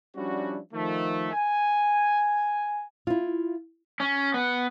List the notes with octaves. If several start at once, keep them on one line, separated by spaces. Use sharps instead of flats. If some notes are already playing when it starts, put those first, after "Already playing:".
F3 G3 C#4 D4 E4 F#4
D#3 F3 A3
G#5
E4 F4
C#4
B3